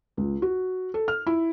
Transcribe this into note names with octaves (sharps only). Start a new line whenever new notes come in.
C#2
F#4
A4
F6
E4